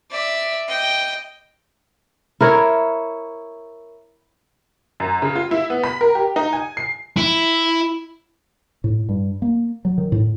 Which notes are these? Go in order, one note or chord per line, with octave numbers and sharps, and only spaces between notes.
D5 E5
D#5 G5
E4 A#4 C#5
F#2
C#3
F4
E4
B3
B5
A#4
G4
D#4
G#5
C7
E4
A2
G2
A#3
F#3
D#3
A2